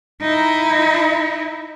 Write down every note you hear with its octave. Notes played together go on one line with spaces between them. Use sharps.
D#4 E4